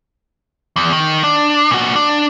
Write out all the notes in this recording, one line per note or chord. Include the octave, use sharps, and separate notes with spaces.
E2
D#3
D4
A#2 F#4
D4